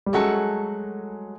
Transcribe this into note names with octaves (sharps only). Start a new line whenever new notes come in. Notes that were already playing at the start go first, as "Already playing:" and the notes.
G3
F#3 G#3 A3 C#4 F#4 A4